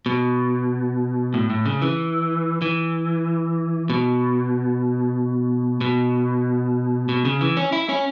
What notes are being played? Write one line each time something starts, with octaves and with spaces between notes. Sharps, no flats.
B2
A2
A2
C#3
E3
E3
B2
B2
B2
C#3
E3
C#4
E4
C#4